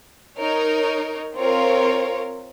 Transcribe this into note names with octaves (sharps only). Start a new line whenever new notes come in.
D#4 A#4 C#5
C4 F4 A#4 C#5